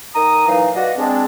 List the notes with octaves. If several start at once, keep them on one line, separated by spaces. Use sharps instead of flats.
D#3 A#5 D#6
A#2 E3 F#3 D#4 F5
F4 F#4 B4 D5 D#5 F#5
G#3 C4 D4